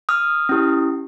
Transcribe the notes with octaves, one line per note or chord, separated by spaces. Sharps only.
D#6 F6
C#4 E4 G4